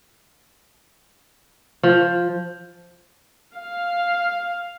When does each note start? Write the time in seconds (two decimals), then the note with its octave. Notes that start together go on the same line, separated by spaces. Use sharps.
1.83 F3
3.57 F5